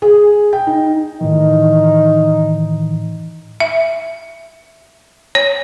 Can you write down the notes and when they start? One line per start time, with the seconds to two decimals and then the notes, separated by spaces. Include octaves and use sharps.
0.02 G#4
0.53 G5
0.67 D#4
1.21 A2 D#3 E3 D#4
3.60 E5
5.35 C#5